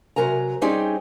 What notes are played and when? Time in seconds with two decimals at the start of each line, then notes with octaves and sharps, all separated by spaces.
0.16 C3 F#3 A#4 G#5 A#5
0.61 G3 C4 C#4 D#4 G4 G#4